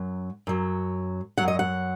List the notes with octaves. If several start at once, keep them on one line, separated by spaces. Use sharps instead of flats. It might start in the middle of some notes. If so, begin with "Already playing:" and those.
Already playing: F#2 F#3
F#2 F#3
F#2 F#3 F#5
D#5
F#5